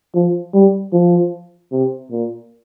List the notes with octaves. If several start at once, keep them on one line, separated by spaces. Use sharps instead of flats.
F3
G3
F3
C3
A#2